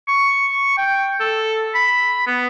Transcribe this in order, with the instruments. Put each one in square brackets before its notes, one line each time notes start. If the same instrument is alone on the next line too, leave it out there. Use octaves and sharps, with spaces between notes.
[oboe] C#6
G5
A4
B5
B3